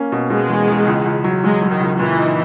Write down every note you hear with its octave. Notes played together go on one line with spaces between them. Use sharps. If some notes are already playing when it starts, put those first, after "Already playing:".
Already playing: A#3 C#4
B2
B2 G#3
E2
E2
C#2
C#2
F#3
F#3 G#3
F#3
D#3
C#2
A#2 E3
D#4